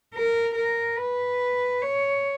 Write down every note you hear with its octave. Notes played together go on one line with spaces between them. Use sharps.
A#4
A#4
B4
C#5